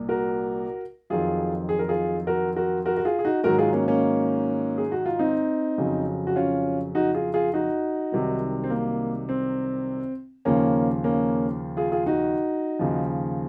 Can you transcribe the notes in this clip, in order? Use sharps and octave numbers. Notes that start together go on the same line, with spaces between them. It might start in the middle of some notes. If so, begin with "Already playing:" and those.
Already playing: C2 A#2
F#4 A#4
F2 D#3 F#3 F4 G#4
G#4
A#4
F4 G#4
F#4 A#4
F#4 A#4
F#4 A#4
F#4
F4 G#4
G#4
D#4 F#4
G#2 D#3 F#3 F#4 A#4
F4 G#4
A#3 C#4
A#3 C#4
G#4
F#4
F4
C4 D#4
F2 C#3 F#3
F#4
C#4 F4
D#4 F#4
F4 G#4
F4 G#4
D#4 F#4
C2 C3 D#3 F#3
C4
A#3
C4
D#2 C#3 F3 A#3 C#4
A#3 C#4
F4 G#4
F4 G#4
D#4 F#4
D#2 C#3 F3